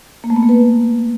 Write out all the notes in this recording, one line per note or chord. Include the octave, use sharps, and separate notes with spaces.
A#3
A3
B3
A#3
B4